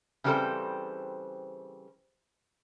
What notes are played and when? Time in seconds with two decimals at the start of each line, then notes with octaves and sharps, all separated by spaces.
0.24 C#3 E3 G3 C4 A4 C5